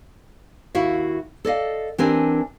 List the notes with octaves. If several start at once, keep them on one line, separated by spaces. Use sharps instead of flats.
D#2 E4 F#4 E5 F5
A4 D5 D#5 F5
E3 C4 D4 G4 A#4 G#5